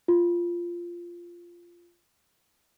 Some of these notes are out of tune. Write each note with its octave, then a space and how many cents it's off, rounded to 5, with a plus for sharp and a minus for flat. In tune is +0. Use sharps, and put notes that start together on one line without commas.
F4 -10